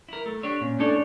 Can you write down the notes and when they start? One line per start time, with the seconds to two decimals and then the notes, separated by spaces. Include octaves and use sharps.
0.09 E4 A#4
0.26 A3
0.43 D4 G4 C#5
0.61 A#2 C#4
0.79 A3 D4 E4 A4 C#5